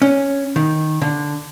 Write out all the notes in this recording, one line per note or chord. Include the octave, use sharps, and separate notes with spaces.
C#4
D#3
D3